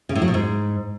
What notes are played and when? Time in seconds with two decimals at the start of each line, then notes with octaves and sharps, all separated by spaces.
0.09 C#3
0.15 A2
0.22 F#3
0.28 B2
0.34 G#2